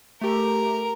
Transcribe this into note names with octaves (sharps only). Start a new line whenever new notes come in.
A3 G4 A#4